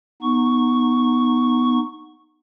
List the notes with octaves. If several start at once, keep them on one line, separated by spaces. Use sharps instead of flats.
B3 D#4 C#6